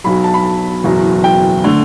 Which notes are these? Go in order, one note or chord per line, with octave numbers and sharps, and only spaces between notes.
B1 B2 F#3 B5
A5
B5
A5
F#1 E2 B2 F#3
G5
D3 A3